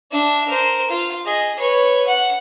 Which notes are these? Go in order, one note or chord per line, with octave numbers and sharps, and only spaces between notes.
D4 E5
A#4 C5
F4
G#4 D#5
B4 C#5
F#5